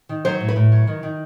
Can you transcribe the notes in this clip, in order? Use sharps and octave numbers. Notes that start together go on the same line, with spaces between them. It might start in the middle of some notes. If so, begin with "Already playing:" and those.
D#3
F#3 C5
A2
B4
A2
F#3
D#3
D#3